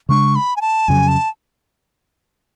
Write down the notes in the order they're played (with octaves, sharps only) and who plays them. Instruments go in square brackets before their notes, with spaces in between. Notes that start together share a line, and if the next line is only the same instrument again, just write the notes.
[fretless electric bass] C#3 G#3 D4 [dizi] C#6
[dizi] B5
G#5
A5
[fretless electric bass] F2 C#3 F#3 [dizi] G#5
[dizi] A5